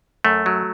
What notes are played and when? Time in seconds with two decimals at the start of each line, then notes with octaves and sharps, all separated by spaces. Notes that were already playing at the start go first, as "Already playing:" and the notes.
0.25 F#2 A3
0.46 F#3